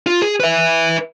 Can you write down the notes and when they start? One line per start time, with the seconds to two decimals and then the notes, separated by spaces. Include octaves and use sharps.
0.07 F4
0.22 G#4
0.40 B4 E5